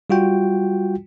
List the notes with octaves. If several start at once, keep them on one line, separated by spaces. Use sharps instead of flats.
G3 F4 F#4 G5